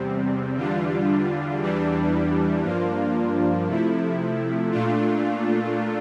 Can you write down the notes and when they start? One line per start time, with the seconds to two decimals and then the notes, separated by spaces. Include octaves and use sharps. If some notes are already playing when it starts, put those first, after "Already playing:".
Already playing: E2 C3 G3 C4
0.56 E2 D3 G3 D4 F4
1.59 E2 E3 G3 D4
2.62 G2 F3 A#3 D4 F4
3.67 C3 F3 A3 E4
4.71 A#2 A3 D4 F4